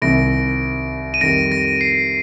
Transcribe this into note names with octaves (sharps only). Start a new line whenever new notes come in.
C2 C3 D#3 A#6 D7
D#7
F2 D#3 G3 A#6 D7
A#6
C7